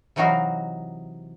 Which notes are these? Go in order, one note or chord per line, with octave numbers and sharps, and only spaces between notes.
C3 E3 F#3 D#4 F#4 F5